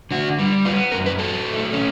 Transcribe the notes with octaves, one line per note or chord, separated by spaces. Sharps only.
D3 F#4
G3
B3 F4
F#2 A#4
B4
F#3 A4
A3
C#4